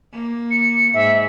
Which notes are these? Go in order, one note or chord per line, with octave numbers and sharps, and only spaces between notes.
A#3
C#7
G#2 E5